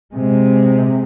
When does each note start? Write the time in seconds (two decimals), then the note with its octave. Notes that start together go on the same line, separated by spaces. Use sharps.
0.14 C3 G#3